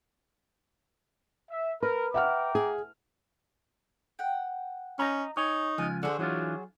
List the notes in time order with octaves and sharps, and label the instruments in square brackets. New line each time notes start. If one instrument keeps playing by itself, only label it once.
[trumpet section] E5
[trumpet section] A#4 [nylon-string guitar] B4
[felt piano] E5 F#5 F6 [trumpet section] G5 A#5 D6
[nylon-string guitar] G#4
[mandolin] F#5 G5
[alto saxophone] C#4 [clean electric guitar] D#5 A#5
[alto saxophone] D#4 [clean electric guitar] C#5 [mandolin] G#5
[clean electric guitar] C#2 F3 [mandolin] G#5
[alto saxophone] D3 [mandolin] F#4 G#4 C5
[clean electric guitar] E3 D4 F4 [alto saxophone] F#3